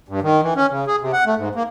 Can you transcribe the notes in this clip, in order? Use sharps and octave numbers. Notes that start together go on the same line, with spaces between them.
G2
D#3
E3
C#4
C#3
G#4
C3
F#5
A3
G#2
A#3